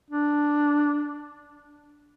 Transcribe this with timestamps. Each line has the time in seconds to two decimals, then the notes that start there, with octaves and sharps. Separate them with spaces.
0.10 D4